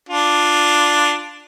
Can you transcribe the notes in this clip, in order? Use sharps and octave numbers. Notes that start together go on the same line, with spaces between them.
D4 F4